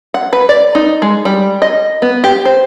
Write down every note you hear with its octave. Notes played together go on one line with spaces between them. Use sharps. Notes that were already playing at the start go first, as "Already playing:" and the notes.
F#5
B4
D5
D#4
G#3
G3
D#5
B3
G4
C5